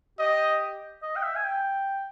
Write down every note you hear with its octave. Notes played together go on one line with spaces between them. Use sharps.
G4 D#5
D#5
G5
E5
G#5
G5